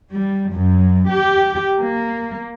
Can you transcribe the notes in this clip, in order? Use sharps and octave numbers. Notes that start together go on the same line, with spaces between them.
G3
F#2
G4
A#3